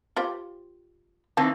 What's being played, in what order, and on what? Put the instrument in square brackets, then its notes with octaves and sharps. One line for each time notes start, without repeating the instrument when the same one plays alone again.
[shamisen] F4 G4 C5
[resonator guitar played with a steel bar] D#3 E3 A#3 [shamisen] C4 A5